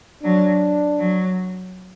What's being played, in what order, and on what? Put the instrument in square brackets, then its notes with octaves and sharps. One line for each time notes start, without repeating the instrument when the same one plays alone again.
[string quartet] F#3 [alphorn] D4
[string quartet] F#3